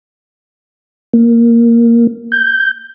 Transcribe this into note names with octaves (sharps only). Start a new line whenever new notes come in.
A#3
G6